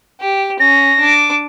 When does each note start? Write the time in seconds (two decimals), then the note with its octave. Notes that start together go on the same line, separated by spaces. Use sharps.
0.21 G4
0.60 C#4 A#6
1.00 D4 D6